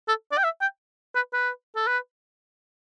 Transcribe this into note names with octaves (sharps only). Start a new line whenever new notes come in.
A4
D5
G5
E5
G5
B4
B4
A4
B4